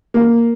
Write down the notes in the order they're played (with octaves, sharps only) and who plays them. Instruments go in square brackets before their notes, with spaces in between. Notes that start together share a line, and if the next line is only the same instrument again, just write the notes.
[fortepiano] A#3